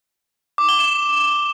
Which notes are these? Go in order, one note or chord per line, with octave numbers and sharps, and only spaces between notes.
D6
G7
E7